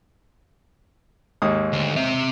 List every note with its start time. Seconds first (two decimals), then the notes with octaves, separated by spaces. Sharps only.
1.42 D#2 G#2 D#6
1.73 D2
1.97 C4 E5